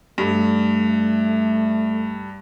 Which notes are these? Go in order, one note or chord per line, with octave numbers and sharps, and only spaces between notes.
G2 A3